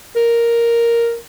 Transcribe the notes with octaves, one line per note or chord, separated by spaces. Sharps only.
A#4